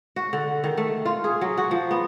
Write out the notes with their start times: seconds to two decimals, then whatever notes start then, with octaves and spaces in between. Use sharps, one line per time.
0.16 F#4
0.33 D3
0.64 D#3
0.77 A3
1.06 F4
1.24 G#4
1.41 F#3
1.58 F#4
1.71 F3
1.91 B3